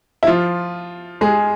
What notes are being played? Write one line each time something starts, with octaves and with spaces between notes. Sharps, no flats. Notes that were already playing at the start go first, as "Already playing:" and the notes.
E4
F3 F4
G#3 G#4